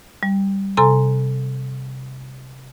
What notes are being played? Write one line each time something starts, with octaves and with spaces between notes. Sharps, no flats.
G3
C3 A4 G#5 A#5 C6